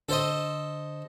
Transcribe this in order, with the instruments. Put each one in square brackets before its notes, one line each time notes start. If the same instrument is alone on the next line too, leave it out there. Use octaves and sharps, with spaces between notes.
[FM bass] D3 [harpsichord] A4 C5 D#5